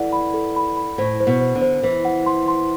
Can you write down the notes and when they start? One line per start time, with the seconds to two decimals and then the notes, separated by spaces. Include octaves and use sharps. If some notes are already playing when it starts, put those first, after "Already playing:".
Already playing: E3 A4 D5 F#5
0.13 B5
0.34 A4
0.56 B5
0.77 B5
0.98 A2 C5
1.20 C5
1.27 B2
1.41 C5
1.55 D3
1.62 C5
1.83 E3 C5
2.05 F#5
2.26 C6
2.48 C6